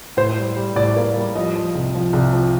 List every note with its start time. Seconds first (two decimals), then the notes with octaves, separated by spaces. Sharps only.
0.17 A2 C5
0.36 G3
0.56 G3
0.76 A2 D5
0.97 A#3
1.16 G3
1.36 F3 D#5
1.55 F3
1.75 C2
1.95 F3
2.13 C2
2.33 F3